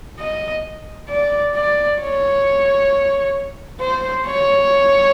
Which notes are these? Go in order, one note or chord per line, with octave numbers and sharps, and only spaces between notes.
D#5
D5
D5
C#5
C5
C#5